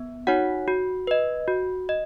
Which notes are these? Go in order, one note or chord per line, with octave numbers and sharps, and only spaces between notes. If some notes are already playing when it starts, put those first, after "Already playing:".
Already playing: B3
D#4 F#4 C#5 F#5
F#4
B4 D#5
F#4
D#5